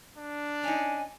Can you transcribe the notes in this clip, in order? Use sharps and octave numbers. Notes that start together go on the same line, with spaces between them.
D4
C#4 D#4 G#5